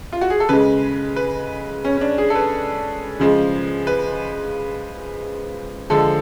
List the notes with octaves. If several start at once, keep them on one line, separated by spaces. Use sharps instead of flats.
F4
F#4
G#4
A4
C#3 G#3 B4
B4
C#4
C#4
D4
G#4
A4
B4
C#3 F3 G#3
B4
D3 F3 G#3 A4